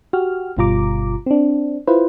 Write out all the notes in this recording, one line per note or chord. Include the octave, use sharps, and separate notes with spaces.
F#4 G4 F6
G1 B2 G3 F4 A#5 D6
C4 D4
E4 F4 B4 C5